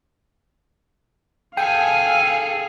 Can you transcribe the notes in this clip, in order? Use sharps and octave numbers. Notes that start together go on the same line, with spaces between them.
G#4 A4 F5 G5 G#5